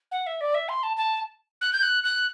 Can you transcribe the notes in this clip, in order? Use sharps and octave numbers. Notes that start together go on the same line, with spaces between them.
F#5
E5
D5
E5
C6
A5
A5
F#6
G6
F#6
F#6